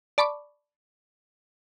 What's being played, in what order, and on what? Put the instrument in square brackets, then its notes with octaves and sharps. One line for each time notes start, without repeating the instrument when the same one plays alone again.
[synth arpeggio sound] D5 A5 B5 C#6 D6